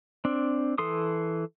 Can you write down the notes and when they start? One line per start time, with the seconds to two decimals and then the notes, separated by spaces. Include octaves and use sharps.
0.25 C4 D4
0.78 E3 A4 C6 D#6